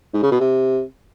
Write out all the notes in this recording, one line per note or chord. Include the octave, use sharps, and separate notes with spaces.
G#2
C#3
B2
C3